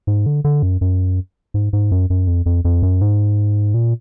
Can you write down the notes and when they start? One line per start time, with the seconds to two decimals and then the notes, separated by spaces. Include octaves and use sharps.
0.07 G#2
0.26 D3
0.44 D3
0.63 F#2
0.81 F#2
1.54 G#2
1.73 G#2
1.91 F#2
2.10 F#2
2.27 F2
2.46 F2
2.65 F2
2.83 F#2
3.01 G#2
3.74 A#2